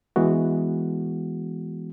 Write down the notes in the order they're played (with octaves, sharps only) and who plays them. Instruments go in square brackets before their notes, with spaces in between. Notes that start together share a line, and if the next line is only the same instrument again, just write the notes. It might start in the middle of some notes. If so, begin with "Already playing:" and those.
[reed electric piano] E3 G#3 B3 F#4